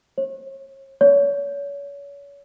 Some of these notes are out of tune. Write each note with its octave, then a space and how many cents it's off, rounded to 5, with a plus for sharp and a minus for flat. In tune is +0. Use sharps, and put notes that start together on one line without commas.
C#5 -35
C#5 +35